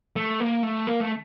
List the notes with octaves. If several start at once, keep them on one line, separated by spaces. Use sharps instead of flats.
A3
A#3
A3
A#3
A3